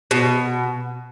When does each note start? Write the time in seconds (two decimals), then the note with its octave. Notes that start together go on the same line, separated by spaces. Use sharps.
0.11 B2